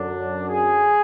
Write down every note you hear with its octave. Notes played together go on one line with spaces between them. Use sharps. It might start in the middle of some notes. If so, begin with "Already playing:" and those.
Already playing: F#2 D3 F#3 D4
G#4